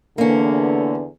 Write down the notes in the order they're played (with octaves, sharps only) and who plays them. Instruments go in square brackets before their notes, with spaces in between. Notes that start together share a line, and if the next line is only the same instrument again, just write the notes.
[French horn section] E2 D3 [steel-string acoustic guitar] A#3 C#4